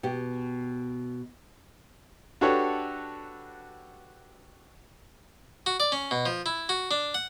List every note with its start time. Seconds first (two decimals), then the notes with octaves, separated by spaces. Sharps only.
0.03 B2 G4
2.41 D4 F#4 G4 A4 B4 C#5
5.66 F#4
5.80 D5
5.92 C#4
6.11 B2
6.26 F3
6.46 E4
6.69 F#4
6.91 D4
7.14 F#5